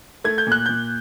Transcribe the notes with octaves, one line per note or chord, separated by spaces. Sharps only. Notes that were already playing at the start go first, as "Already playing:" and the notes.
A3 G#6
G6
A#2
F#6
A#2 G6